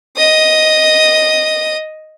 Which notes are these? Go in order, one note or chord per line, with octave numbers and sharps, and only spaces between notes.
D#5 D#6